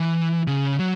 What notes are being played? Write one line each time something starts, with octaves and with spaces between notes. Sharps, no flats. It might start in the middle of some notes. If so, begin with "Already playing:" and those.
Already playing: E3
C#3
F#3